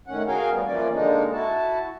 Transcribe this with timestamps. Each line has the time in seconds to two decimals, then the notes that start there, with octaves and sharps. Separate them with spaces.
0.08 A2 D#3 C#4 F#5
0.27 F#4 G#4 A#4 F5 G5 G#5
0.51 A2 G3 B3
0.66 E3 F3 A#3 C#4 D5
0.93 D3 G#3 A#3 D4 D#4
1.33 E4 F#4 A5